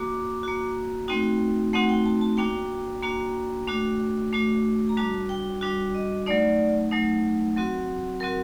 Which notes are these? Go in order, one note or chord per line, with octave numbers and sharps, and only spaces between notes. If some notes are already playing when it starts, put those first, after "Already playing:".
Already playing: A#3 F#4 D6
A#3 F#4
A3 C4 D#4 F#4 G5
A3 C4 D#4 F#4 F#5
G5
A5
A5
A#3 D4 F#4 G5
A#3 D4 F#4
A3 D4 F#4
A3 D4 F#4
A#5
G3 D4 F#4 A5
G5
G3 D4 F#4 G5
D#5
F#3 A3 D#4 D5
F#3 A3 D#4
F#3 C4 F#4
F#3 C4 F#4 A#4